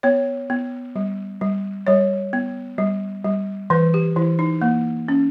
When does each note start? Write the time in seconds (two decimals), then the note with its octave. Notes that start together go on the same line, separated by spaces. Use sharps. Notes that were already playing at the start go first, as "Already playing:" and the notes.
0.03 B3 C#5
0.50 B3
0.96 G3
1.41 G3
1.87 G3 C#5
2.33 B3
2.78 G3
3.24 G3
3.70 E3 B4
3.94 G4
4.16 E3 E4
4.39 D#4
4.62 A#3
5.08 C#4